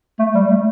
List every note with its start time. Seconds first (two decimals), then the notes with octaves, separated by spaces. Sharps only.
0.19 A3
0.34 G3
0.50 A3